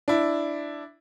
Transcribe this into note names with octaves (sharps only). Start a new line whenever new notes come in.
D4 E4